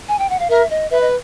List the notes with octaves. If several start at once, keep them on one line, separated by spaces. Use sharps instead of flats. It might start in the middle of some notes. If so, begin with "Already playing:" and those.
G#5
G5
F#5
F5
A#4 E5
D#5
B4 E5
D#5